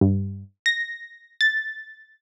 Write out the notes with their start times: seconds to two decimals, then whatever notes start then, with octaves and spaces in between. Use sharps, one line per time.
0.01 G2
0.66 A#6
1.41 A6